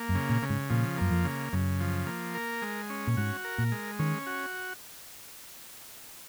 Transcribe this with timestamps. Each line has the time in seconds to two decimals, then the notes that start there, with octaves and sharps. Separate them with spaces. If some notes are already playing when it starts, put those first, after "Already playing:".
Already playing: A#3
0.09 F#2
0.15 C#3
0.29 A#2
0.42 C#3
0.50 G#2
0.70 A#2 F3
0.97 F#2 A#3
1.11 F2
1.24 C#3
1.53 F#2 C#3
1.80 F3
2.07 A#3
2.35 A#4
2.62 G#3
2.90 C#4
3.07 A#2
3.17 G#2 F#4
3.44 A#4
3.58 A#2
3.72 G#3
3.99 D#3 C#4
4.27 F#4